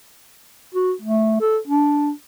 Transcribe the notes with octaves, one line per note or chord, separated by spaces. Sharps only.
F#4
A3
A4
D4